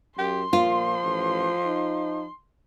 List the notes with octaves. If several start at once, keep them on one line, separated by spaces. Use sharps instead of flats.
F#2 G4 C6
A#2 F3 F4
A1
D#4